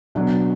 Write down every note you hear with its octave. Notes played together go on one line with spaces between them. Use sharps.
B1 B2 F#3 D4